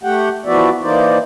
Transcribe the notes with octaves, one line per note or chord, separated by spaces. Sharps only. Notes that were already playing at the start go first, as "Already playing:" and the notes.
A3 G4 F#5 G5
E3 F3 B3 F#4 D5 E5
E3 A#3 D#4 C5 D5